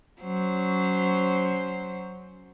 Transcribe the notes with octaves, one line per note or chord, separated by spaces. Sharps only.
F#3 C#4 C5